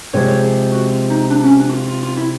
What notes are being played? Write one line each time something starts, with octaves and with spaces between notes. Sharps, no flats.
C3 F3 G#3 C#5
C#5
G#4
F#4
F4
D#4
D4
C#4
D4
F#4
F4
F4
F4
E4